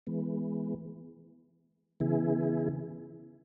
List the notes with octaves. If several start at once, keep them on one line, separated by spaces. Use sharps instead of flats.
E3 G#3 B3
C#3 E3 B3 E4 G#4